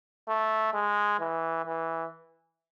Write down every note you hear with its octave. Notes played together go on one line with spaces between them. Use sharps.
A3
G#3
E3
E3